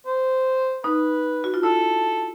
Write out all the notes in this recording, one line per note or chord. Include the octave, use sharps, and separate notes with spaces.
C5
D#4 B4
F#4
F4
E4 A4